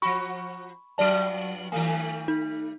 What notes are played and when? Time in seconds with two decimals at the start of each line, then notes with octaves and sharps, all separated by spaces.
0.02 F3 F#4 B5 C#6
0.98 G2 F3 F#3 D5 A5
1.72 D#3 G3 A3 G#5
2.28 D#4